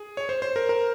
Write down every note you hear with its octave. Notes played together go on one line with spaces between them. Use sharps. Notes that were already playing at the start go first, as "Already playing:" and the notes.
Already playing: G#4
C#5
C5
C5
A#4
A#4